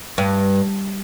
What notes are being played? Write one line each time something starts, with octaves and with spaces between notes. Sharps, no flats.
G2